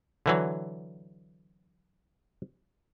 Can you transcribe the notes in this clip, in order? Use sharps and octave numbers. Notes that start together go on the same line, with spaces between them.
D3 E3 F#3